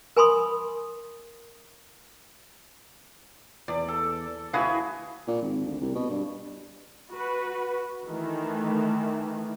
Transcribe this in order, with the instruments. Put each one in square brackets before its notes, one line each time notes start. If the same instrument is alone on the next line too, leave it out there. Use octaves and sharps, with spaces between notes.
[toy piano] A#4 G#5 B5 C6 D#6
[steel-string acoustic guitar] E2 [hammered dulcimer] D5
[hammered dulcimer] A4
[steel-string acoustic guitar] D2 E4 F5 [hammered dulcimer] F#4 G#4 B4
[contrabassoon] A#2
G#1
D2
C2
B2
G2
[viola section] F#4 B4
D#3 E3 A3